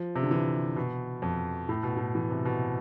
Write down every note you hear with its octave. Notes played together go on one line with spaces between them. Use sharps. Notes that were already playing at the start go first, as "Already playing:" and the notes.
Already playing: F3
C3
D3
E3
B2
F2
A2
B2
A2
E3
C3
B2